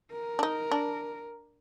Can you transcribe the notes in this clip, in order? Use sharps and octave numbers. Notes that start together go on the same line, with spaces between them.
A#4
D4
D#4
D4